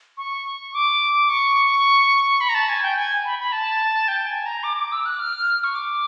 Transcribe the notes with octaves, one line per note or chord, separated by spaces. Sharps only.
C#6
D6
C#6
B5
A#5
A5
G#5
G5
G#5
B5
B5
A5
G5
G#5
A#5
D6
D6
E6
F#6
F6
C#6
D6